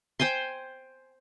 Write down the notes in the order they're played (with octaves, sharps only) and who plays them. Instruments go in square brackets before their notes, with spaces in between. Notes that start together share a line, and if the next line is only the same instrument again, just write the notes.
[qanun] C5 G5 G#5 C6